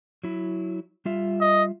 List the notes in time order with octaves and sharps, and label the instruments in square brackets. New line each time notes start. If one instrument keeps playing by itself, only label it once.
[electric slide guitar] F#3 E4
G3 F4 E5
[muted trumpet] D#5